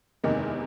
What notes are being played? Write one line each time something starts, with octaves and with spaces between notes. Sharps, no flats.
F#1 E2 C3 D#3 G#3 A#3 A#4